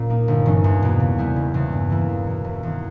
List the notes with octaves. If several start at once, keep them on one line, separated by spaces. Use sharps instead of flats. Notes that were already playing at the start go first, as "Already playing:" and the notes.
Already playing: A#2 C#4
A#3 D#4
G1
G2 E3 G#3 C#4
E2
B2 A#3
C#3
G3 B3 E4 G#4
E1
E2 C#3
G2
E3 A#3 E4
E2
B2 A#3
E1
E2 D#3